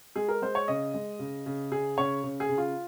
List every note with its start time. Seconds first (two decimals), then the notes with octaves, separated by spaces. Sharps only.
0.16 G#3 G#4
0.28 A#4
0.42 G#3 C5
0.55 C#5
0.68 C#3 D#5
0.94 G#3
1.19 C#3
1.46 C#3
1.71 C#3 G#4
1.97 C#3 C#5
2.24 C#3
2.40 G#4
2.49 C#3
2.58 F4